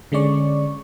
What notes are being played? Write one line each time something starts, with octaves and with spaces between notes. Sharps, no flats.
D3 G#3 C#4 D5 C#6